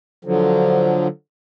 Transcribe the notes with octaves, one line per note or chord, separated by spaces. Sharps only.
D3 F3 F#3